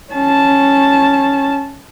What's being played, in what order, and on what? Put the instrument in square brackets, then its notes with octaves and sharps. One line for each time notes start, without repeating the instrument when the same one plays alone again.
[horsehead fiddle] C#4 A5